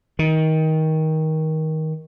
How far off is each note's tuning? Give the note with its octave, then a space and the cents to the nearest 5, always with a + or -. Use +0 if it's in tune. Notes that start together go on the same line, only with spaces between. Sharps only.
D#3 +20